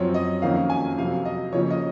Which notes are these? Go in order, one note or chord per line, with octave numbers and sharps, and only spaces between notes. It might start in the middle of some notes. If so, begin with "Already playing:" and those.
Already playing: F#2 F3 C4 C#5
D#5
F2 D#3 A#3 C#4 F5
G#5
F2 C3 F#3 F5
D#5
F2 C#3 F3 A#3 C#4 C#5
D#5